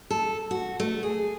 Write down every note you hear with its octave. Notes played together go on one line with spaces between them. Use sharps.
A4
F#4
A3
G#4